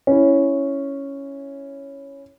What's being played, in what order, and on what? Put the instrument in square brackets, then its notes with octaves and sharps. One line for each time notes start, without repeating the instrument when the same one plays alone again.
[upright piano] C#4 E4